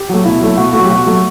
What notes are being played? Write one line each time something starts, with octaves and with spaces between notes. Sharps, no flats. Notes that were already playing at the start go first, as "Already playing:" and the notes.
Already playing: G4
F#3 A3
B2 E4
F#3 A3
B2 F#4
A3 F#4
F#3
G4
B2 F#4
F#3 A3